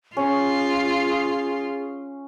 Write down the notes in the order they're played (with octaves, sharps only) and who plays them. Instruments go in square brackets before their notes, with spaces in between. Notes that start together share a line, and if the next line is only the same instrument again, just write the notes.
[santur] C#4 [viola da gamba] F4 [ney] G#4